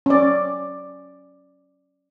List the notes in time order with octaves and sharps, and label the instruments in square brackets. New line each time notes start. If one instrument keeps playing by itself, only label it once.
[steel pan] C#4 D5